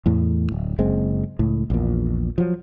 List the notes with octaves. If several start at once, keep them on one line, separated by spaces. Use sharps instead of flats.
E2 A2
D1
F#1 G#3 C4
C#2 A2
A#1 E2 A#2
F3 F#3